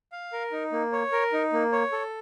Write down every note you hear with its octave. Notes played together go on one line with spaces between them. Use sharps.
F5
A#4
D#4
A#3
C#5
A#4
D#4
A#3
C#5
A4